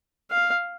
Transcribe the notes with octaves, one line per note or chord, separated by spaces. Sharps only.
F5